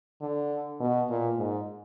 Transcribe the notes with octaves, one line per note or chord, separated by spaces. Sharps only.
D3
B2
A#2
G#2